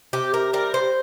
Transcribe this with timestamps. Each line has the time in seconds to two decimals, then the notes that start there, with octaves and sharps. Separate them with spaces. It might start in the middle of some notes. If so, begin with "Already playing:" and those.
0.13 C3 G4
0.34 A#4
0.53 G3 A#4
0.74 C5